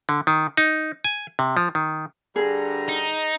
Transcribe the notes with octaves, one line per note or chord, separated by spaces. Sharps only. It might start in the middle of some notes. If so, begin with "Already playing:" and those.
D3
D#3
D#4
G#5
C3
F3
D#3
G2 D3 G#4 A#5
D#4